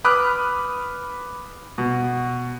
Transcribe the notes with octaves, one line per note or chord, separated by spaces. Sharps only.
B4 B5 D6 D#6 F6 F#6
B2